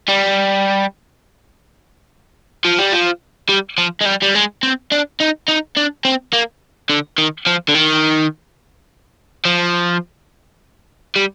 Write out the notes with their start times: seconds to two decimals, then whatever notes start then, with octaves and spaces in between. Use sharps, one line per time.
0.09 G3
2.65 F3
2.78 G3
2.92 F3
3.49 G3
3.78 F3
4.01 G#3
4.06 G3
4.23 G3
4.35 G#3
4.63 C4
4.92 D4
5.20 D#4
5.48 D#4
5.77 D4
6.05 C4
6.33 A#3
6.90 D3
7.18 D#3
7.46 F3
7.69 D3
7.75 D#3
9.45 F3
11.16 G3